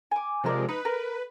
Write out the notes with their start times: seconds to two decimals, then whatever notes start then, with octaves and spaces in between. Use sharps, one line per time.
0.11 G#5 D6
0.44 C3 F3 G#3 C4 A#4 D5
0.69 D#4 B4
0.85 A#4